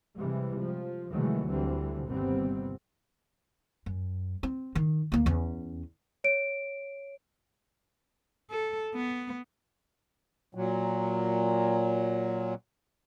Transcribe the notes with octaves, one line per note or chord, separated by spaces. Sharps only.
C3 E3 G3 G#3
F3
C3 D#3 E3 F#3 G#3 A3
D2 D3 E3 G3 C4
G1 D#2 C3 G3 B3 C4
F#2
C4
D#3
D2 A#3
E2 C#4
C#5 D7
A4
B3
A#2 F#3